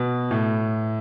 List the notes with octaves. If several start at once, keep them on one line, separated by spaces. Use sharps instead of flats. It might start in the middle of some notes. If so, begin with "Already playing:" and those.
Already playing: B2
A2